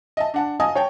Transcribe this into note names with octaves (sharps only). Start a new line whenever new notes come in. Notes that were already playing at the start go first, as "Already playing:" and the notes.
D#5 E5 A5
D4 F#5 A5
D#5 F5 G#5 A5 D#6
C#5 G5 A5